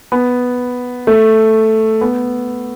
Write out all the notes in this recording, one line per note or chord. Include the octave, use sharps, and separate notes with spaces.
B3
A3
B3